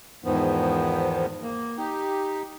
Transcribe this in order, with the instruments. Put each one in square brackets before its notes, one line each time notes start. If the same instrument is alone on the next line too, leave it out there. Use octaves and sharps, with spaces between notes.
[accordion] E2 G#2 D#3 F3 B3
A#3
D#4 G4